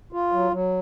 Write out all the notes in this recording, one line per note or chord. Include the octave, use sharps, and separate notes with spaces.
F4
F#3
F#3